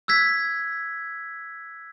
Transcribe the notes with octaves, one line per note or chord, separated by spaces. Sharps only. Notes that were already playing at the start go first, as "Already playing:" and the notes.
E6 F#6 G#6 B6